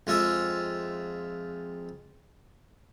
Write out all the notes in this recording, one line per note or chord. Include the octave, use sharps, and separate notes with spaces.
F2 G#3 F4 E5